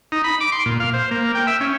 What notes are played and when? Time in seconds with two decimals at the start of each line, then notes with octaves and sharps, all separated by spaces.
0.12 D#4
0.24 B5
0.41 D6
0.52 C6
0.66 A#2
0.80 F5
0.94 C5
1.11 A#3
1.35 G5
1.47 E5
1.61 C#4